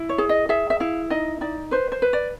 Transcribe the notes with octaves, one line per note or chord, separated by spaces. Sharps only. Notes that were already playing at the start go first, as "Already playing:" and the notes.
Already playing: E4
C#5
G#4
D#5
G#4 E5
E5
E4 F5
D#4 D#5
D#4 D5
B4 C5
C5
B4
D5